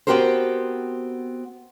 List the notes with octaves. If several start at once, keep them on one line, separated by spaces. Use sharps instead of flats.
B3 C4 F#4 G4 A#4 C5